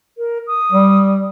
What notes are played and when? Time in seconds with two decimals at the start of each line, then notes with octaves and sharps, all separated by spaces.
0.18 A#4
0.47 D#6
0.72 G3